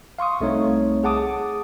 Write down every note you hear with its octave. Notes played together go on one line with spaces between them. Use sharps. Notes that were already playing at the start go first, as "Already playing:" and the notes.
F5 C6 C#6 D#6
C2 A3 C4 D#4 C#5
G#4 F#5 A5 D6 D#6